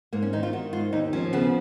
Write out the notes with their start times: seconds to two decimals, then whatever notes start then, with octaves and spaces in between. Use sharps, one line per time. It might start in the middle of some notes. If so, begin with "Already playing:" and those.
0.13 G#2 A#3
0.23 C#4
0.33 D#3 D#4
0.43 F4
0.53 D#3 F#4
0.73 G#2 F4
0.93 D#2 D#4
1.13 F3 C#4
1.33 C#3 B3